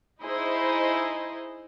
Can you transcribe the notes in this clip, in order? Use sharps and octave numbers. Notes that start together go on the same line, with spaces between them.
D#4 E4 G#4 C5 D#5